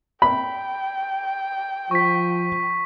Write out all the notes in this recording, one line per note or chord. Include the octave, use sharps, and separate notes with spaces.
G5 B5
F3 C#6 B6